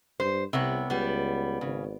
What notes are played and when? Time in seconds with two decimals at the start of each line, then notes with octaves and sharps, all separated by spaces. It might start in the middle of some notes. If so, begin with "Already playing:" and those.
0.20 G2 C5
0.53 C2 C3 B3 C#5
0.90 C#2 G3 B3
1.61 G#1 C#3